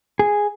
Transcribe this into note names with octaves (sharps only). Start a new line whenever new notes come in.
G#4